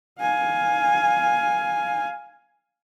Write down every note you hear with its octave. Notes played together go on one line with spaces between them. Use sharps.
F5 G#5